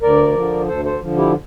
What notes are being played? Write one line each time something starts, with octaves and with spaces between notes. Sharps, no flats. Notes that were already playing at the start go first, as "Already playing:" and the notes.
D2 A#4 D5
D3 F3
D2 A4 C5
A4 C5
D3 F3
E4 G4